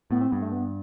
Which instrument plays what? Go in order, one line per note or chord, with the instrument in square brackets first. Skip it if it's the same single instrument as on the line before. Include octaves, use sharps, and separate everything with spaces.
[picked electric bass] A2 [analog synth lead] B3
[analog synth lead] C4
[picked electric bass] G2 [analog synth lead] B3
[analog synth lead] A3
B3